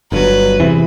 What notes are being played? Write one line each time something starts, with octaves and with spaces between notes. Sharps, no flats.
G1 G2 F#3 B4
E2 C3 E3